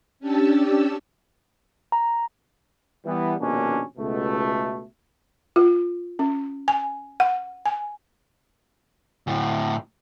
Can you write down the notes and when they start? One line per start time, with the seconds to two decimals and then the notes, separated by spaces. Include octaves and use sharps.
0.20 C#4 D4 G4 A5 E6
1.92 A#5
3.05 E3 G3 B3
3.40 A#1 D#2 B2 A#3 C#4 D4
3.98 C#2 B2 A3
5.56 F4
6.19 C#4
6.68 G#5
7.20 F#5
7.66 G#5
9.27 D2 A2